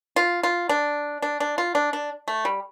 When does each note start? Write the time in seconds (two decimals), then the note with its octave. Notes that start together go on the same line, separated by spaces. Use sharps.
0.16 F4
0.43 F4
0.69 D4
1.22 D4
1.40 D4
1.58 F4
1.75 D4
1.93 D4
2.28 A3
2.45 G3